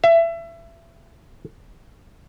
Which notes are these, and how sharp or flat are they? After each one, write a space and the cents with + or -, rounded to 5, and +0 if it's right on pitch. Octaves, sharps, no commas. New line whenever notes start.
E5 +25